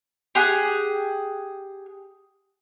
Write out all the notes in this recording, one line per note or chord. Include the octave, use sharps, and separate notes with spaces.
G4 G#4 F#5